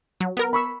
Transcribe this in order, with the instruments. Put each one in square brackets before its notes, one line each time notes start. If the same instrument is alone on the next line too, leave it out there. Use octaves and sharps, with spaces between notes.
[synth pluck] F#3
B3 A#4
[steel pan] B5 C#6 E6